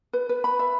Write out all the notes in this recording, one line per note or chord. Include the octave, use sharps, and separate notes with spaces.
B4
B4
B5
E5